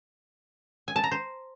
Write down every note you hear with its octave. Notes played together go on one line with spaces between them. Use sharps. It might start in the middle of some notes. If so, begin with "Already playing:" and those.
G#5
A5
A#5
C5